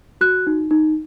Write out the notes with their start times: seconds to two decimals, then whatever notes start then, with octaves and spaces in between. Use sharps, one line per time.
0.21 F#4 F#6
0.47 D#4
0.71 D#4